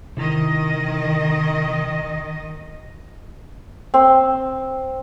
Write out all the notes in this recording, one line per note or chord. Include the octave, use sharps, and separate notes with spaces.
C3 D#3 E4 D#5 A#5
C4 C6